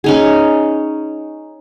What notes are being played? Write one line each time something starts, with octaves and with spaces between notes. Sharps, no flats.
C#4 D#4 G#4